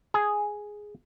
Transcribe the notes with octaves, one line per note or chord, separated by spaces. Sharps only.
G#4